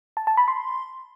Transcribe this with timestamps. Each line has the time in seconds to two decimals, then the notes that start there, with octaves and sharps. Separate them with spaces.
0.17 A5
0.27 A5
0.37 B5
0.48 C6